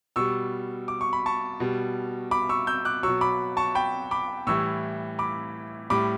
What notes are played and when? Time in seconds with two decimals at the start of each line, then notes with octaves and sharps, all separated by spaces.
0.16 B2 G3 C#6 E6
0.88 D6
1.01 C#6
1.13 B5
1.26 A5 C#6
1.60 B2 G3
2.31 B5 D6
2.49 C#6 E6
2.67 E6 G6
2.85 D6 F#6
3.03 B2 F#3 C#6 E6
3.21 B5 D6
3.57 A5 C#6
3.75 G5 B5
4.11 B5 D6
4.47 A2 E3 G3 C#6 E6
5.19 B5 D6
5.90 A2 G3 B5 D6